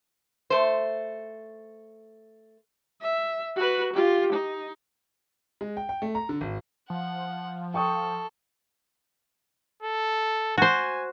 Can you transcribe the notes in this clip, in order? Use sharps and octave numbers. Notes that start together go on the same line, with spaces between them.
A3 C5
E5
F#4 B4
F4 G4
D#4
G#3
G5
G5
A3
A#5
D3
G#1
F3 F#5
A4 G5 C#6 D#6
A4
F#4 C5 G#5